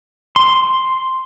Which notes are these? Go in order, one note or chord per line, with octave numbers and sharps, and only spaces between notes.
C6